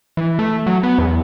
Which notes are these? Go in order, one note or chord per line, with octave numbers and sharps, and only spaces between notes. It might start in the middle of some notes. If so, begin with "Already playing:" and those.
E3
A3
F#3
B3
E2